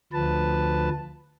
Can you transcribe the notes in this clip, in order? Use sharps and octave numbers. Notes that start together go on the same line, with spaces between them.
D2 F3 B4 A5